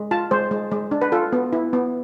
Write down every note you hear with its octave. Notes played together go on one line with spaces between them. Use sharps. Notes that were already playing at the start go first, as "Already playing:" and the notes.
Already playing: G#3
F4 A5
G#3 C5
G#3
G#3
D4
B4
F4 A4
B3
E4
B3